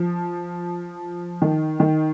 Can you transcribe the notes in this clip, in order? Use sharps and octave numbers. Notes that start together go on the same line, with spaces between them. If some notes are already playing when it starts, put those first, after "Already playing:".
Already playing: F3
D#3
D#3